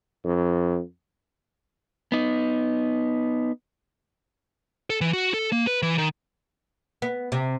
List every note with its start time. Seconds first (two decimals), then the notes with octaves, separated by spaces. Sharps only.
0.24 F2
2.12 B3 D#4
4.90 A4
5.01 E3
5.13 F#4
5.34 A4
5.52 A#3
5.67 B4
5.82 E3
5.98 D#3
7.02 B3
7.32 C3